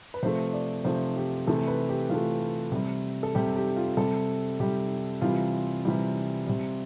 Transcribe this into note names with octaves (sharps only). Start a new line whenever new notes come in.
B4
C3 F3 A3 C5
D5
C3 F3 A3 C5
G4
C3 E3 A3 A4
B4
G4
C3 E3 A3 F4
C3 G3
A4
C3 G3 G4
G4
F4
C3 G3 A4
C3 G3 G4
C3 E3 G3 F4
C3 E3 G3
C3 G3